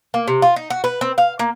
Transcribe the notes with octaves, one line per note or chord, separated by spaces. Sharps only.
A#3
C3
F4
D#4
F#4
B4
C4
F5
A#3